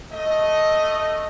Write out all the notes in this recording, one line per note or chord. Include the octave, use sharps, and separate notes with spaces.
A3 D#5